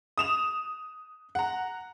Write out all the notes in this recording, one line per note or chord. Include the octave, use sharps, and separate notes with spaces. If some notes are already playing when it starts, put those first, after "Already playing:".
D#6 E7 F7
F#5 A#5